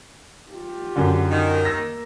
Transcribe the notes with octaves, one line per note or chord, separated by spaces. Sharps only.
F4 G4
F#2 D3
D#3
A#3 E6 A#6